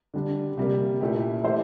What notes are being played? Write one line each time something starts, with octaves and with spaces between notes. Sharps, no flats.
D3 G3 D4
C3 G3 A#3
A#2 A3 E4 G4
E3 A3 E4 G4 C5